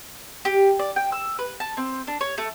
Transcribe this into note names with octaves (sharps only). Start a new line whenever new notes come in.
G4
D5
G5
E6
B4
A5
C4
D4
C#5
A3